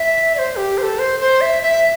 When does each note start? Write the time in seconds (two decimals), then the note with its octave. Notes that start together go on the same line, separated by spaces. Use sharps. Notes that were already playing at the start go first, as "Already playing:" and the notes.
Already playing: E5
0.35 D5
0.39 C5
0.56 G4
0.78 C5
0.83 A4
0.99 C5
1.20 C5
1.41 E5
1.62 E5